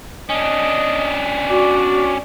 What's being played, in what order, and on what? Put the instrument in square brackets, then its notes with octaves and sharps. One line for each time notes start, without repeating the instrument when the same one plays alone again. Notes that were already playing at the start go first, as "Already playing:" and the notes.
[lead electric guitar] C#4 D4 [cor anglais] D#5
[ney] F#4 [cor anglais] D5